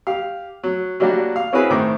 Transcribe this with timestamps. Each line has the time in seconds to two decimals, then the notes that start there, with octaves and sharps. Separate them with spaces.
0.07 G4 F5
0.63 F#3
1.00 F#3 G3 A#3 D4 F#4 G4
1.36 F5
1.53 C4 C#4 E4 F#4 G#4 B4
1.70 A2 D#3 C4 D6